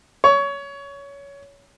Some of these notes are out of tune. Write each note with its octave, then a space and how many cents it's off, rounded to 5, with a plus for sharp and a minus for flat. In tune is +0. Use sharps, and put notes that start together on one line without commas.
C#5 +20